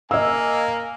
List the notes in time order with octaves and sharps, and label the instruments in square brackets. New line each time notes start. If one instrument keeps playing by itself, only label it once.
[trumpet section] A#3 G#5 [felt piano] D#5 E6